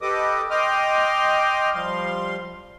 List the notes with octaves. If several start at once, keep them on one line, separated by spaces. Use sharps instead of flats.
G4 A4 B4 D#5 D6 D#6
D#5 G5 C6 D6 D#6 F6
F3 G3 F5 C6